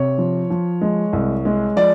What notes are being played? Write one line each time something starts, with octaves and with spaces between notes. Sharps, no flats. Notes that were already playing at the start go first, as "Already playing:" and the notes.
Already playing: C3 C#5
F3
F3
G#3
C2
G#3
F3 D5